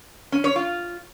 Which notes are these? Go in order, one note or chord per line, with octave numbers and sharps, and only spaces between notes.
C#4
C#5
F4